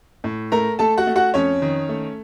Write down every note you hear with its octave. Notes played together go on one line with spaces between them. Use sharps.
A2
A3 A#4 A#5
A3 A4 A5
F#4 F#5
A3
F#4 F#5
F2 C#4 C#5
D#3
A3